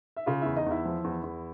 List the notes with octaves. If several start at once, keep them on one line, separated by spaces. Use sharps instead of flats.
E5
C#3 F4 F5
E2 E4 E5
D#4 D#5
E2 E4 E5
F3
E2
E2